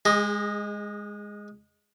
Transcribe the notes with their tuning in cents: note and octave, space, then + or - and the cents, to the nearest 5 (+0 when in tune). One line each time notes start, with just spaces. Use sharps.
G#3 -5 G#4 -40 D#5 +0